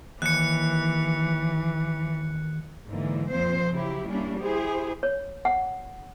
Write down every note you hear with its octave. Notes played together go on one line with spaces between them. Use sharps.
D#2 E3 F#6 C#7
G#2 D3 E3 A#3
F2 A#2 F3 C4 C5
C#3 F#3 E4 G4
G3 A#3 C#4 D4 E4
E4 G4 G#4 C5
C#5
F#5